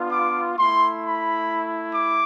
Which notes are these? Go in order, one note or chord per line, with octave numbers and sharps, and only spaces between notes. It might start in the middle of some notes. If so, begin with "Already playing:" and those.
Already playing: B3 D4 F4
D6
A3 E4 C6
B5
D6